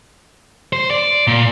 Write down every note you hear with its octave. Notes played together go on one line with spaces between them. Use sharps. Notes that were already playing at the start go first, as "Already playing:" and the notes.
C5
D5
A#2